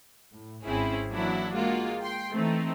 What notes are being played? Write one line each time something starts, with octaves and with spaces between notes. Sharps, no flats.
A2
G#1 C4 C#4 E4 G#4
E3 F#3 A#3 D4 E4 F#4
G#3 A#3 F4 F#4
G5 C6
E3 A3 C4 D#4